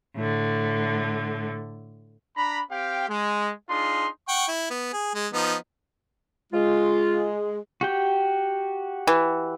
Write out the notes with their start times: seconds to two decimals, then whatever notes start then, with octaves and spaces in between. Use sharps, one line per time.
0.16 A2 D3
2.36 D4 A#5 B5
2.70 C4 G4 F5 G5
3.09 G#3
3.69 D4 D#4 F4 G#4 C6
4.28 F#5 G5 C#6
4.48 E4
4.70 B3
4.93 G#4
5.14 G#3
5.33 F3 B3 D#4
6.53 G#3 F4
7.81 F#4 G4 G5
9.07 E3